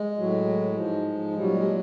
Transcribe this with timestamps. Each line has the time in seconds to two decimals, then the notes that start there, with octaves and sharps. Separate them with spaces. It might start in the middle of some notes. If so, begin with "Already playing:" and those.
Already playing: G#3
0.18 A2 F#3
0.76 G#2 F3
1.35 A#2 F#3 G3
1.54 G#3